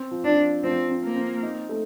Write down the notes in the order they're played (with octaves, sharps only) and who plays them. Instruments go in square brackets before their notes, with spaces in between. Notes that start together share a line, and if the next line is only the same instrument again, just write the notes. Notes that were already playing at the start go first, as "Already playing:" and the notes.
Already playing: [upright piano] C4
F3
[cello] D4
[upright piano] F3
[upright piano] F3 [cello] C4
[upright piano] C4
[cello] A#3
[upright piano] C4
D#4
A3